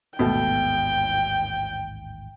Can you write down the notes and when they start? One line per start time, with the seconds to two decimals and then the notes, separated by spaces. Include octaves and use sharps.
0.19 A1 D#2 G#2 B2 A3 G5